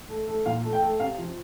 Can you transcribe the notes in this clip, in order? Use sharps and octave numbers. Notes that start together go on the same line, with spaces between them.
A3
A3
A#2 F5
A3
G5
A3
C3 F5
F3